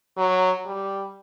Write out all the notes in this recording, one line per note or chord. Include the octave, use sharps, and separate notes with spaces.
F#3
G3